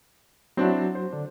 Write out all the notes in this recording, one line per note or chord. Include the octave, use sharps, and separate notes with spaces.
F#3 C4 D4 E4 F#4
C5
D3 D4